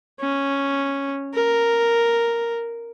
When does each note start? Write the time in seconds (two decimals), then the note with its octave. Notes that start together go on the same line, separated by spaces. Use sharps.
0.20 C#4
1.34 A#4